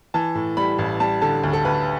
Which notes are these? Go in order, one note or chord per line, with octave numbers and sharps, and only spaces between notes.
E3 A5
A2
G3 B5
A1
G3 A5
D3 A5
D2
A4
D2 B4